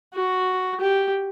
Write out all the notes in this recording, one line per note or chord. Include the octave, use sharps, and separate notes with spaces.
F#4
G4